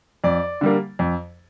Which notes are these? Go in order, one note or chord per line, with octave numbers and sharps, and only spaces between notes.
F2 D5
D3 G3 A#3
F2